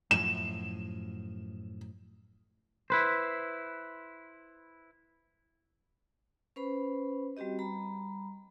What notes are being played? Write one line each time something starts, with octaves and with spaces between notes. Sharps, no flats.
F#2 A2 F3 E7
E4 B4 C5
C#4 B4 C5 B5
G3 C4 F#4 G4 D#5
G3 A#5 B5